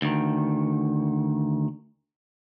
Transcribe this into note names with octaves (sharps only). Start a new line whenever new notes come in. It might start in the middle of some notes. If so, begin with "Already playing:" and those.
D2 D#3